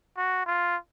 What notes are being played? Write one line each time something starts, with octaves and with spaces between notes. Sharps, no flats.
F#4
F4